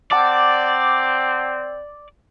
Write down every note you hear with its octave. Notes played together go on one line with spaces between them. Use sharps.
C4 D5 F#5 A5 D6